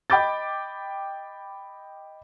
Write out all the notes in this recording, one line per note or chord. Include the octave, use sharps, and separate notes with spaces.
D#5 G5 B5 D6 G6 A6